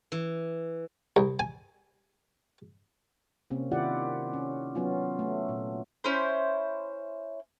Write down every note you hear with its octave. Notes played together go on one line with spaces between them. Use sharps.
E3
C2
G#5
C3 A#3 C4 C#4
D#3 E4 F4 G4 D5 F#5
C#4
F#3 B3 C#4 F4
A3
A#2
C#4 E4 C5